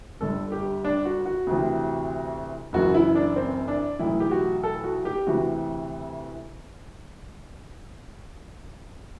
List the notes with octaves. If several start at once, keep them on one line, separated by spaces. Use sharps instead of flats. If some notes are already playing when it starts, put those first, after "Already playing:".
G1 G2 D3 A4
G4
D4
F#4
F#4
D2 C3 E3
F#1 F#2 E3 F#4
E4
D4
C4
D4
B1 A2 E3 E4
G4
F#4
A4
F#4
G4
D2 C3 E3 F#4